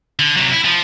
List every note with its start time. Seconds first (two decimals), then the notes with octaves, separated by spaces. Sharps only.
0.19 D3
0.37 C3 F#3
0.52 E4
0.65 F3